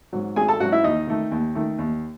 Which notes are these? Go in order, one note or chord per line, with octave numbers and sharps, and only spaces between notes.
G#2 F#3
G#1 G#4 G#5
A4 A5
G#2 F#3 F#4 F#5
E4 E5
D#2 D#4 D#5
D#3 A3
D#2
D#3 A3
D#2